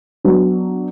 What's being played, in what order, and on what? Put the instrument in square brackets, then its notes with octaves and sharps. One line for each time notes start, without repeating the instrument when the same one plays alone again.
[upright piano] F#3 B3 D4